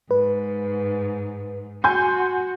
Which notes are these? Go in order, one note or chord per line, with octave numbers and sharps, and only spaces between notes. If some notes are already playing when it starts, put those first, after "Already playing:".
G#2 B4
F#4 G#5 C6 G6